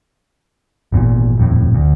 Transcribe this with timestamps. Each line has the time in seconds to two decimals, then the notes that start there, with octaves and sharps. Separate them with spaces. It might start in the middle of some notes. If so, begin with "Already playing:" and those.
0.92 G#1 E2 A#2
1.38 D#1 F2 A2
1.74 D2